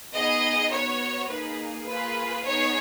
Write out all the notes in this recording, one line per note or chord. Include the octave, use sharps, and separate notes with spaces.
B3 D#4 G#4 D#5
B3 F#4 C#5
A#3 D#4 G#4 B4
A#3 F4 G#4 B4
B3 D#4 G#4 C#5